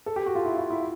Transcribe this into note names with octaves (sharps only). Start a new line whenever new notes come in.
A4
G4
F#4
F4
E4
F4
E4